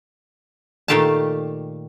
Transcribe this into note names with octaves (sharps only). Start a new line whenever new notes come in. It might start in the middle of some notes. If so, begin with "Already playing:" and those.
A#2 D#3 A3 G4 F5 A5